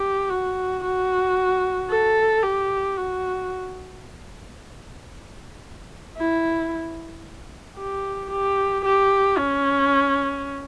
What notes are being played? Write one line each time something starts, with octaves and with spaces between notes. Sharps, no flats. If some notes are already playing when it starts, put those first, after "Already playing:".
Already playing: G4
F#4
F#4
A4
G4
F#4
E4
G4
G4
G4
C#4